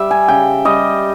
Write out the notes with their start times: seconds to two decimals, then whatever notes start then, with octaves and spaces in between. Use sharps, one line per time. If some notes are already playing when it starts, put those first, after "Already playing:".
Already playing: G3 E5
0.11 G#5
0.28 C#3 G5
0.65 G3 D#5